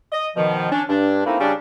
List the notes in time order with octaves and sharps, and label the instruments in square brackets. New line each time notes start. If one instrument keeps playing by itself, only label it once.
[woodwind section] D#5
B2 D#3 F3
C#4 D4
G2 D4
A3 A#3 C4 D#4 E4
C#3 G3 C#4 D4